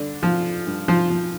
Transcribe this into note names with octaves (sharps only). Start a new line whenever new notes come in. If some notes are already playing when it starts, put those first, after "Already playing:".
Already playing: G2 D3 D4
F3 F4
G2
F3 F4
F3